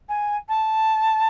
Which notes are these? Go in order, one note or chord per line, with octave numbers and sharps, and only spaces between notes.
G#5
A5